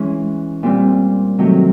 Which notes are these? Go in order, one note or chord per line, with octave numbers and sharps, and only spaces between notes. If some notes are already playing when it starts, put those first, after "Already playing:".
Already playing: E3 G#3 C#4
A#2 G3 C4
C3 D#3 F#3 A3